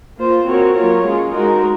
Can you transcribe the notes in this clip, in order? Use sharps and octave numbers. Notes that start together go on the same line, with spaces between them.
A#3 F4 C5
C4 F#4 A#4 C#5
F#3 A#3 F4 A#4 C#5
G#3 C#4 F4 G#4
G#3 D#4 F#4 A#4